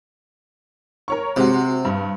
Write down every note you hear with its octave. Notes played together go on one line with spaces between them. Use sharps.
A#4 C#5 C#6
C3 G#3 F#4
G2